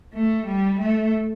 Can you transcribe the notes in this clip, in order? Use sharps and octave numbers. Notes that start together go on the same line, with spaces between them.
A3
G3
A3